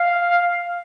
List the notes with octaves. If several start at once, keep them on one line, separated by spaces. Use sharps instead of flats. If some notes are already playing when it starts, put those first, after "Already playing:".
Already playing: F5